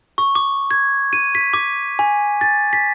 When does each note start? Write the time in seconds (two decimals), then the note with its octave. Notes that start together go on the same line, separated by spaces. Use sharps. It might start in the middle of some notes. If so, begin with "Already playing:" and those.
0.18 C#6
0.35 D6
0.71 G#6
1.13 D#7
1.35 B6
1.53 D6
1.99 G#5
2.41 A6
2.73 B6